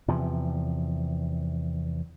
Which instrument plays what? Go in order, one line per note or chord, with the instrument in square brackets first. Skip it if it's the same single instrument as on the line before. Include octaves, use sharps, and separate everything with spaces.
[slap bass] E2 C3 F3